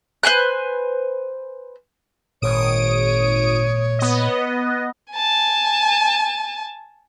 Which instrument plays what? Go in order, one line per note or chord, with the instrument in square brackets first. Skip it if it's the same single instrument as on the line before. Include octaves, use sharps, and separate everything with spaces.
[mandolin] B4 C5 G#5 F#6
[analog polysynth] G#1 D#6 D7 [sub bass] A#2 [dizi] C#5
[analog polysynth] B3 D#5
[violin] G#5 A5